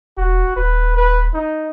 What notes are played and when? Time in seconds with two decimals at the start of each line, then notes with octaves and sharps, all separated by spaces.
0.17 E1 F#4
0.56 D#1 B4
0.97 B4
1.34 D#4